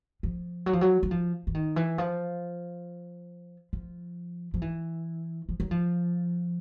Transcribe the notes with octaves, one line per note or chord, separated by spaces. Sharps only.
F3
F#3
F3
F#3
F#3
F3
E3
D#3
E3
F3
F3
F3
E3
F3
F#3
F3